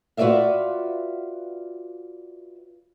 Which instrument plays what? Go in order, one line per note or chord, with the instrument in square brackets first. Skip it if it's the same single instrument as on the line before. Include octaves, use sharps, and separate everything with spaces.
[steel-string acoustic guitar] F4 F#4 B4 D5 E5 F5